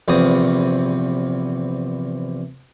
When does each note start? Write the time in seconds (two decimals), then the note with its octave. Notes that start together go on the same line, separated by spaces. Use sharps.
0.08 A#1 E2 C3 D#6